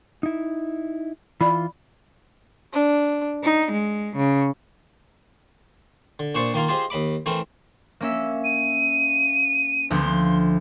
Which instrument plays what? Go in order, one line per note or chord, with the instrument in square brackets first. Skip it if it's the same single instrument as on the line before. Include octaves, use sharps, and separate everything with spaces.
[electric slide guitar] D#4 E4
[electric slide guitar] E3 F4 [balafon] D5 B5
[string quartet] D4
D#4
G#3
C#3
[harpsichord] D3
A#2 D4 C5 C#6
D#3 A#3 F4 A#4
F4 G4 G#4 C5 D#5
D#2 D#5 B5 D6
E3 A3 C4 A#4
[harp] A#3 C#4 E5
[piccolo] D#7
[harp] D2 F3 B3 [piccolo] C6